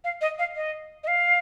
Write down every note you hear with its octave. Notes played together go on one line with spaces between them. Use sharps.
F5
D#5
F5
D#5
D#5
F5